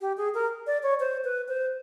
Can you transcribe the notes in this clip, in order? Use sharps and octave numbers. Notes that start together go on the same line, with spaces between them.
G4
G#4
A#4
D5
C#5
C5
B4
C5